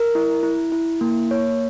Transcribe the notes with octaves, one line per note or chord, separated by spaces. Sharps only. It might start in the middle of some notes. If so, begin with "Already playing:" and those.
Already playing: A#4
E4
E4
E4
A#3
C#5